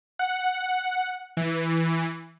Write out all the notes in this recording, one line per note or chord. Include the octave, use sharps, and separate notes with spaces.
F#5
E3